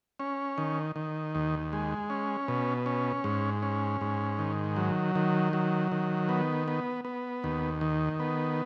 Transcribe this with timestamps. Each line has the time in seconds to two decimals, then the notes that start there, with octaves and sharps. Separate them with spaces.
0.20 C#4
0.58 D#3
0.96 D#3
1.35 D#2
1.73 G#3
2.10 C#4
2.48 B2
2.86 C#4
3.24 G#2
3.62 C#4
4.01 G#2
4.39 D#3
4.76 F#3
5.15 D#3
5.53 F#3
5.92 D#3
6.29 B3
6.68 B3
7.05 B3
7.44 D#2
7.81 D#3
8.20 B3